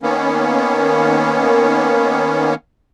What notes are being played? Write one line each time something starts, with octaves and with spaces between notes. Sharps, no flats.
D#3 A#3 B3 C#4